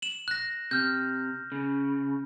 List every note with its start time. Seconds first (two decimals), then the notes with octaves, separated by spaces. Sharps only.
0.02 E7 F#7
0.28 F#6 A#6
0.71 C3 F6 G6
1.52 C#3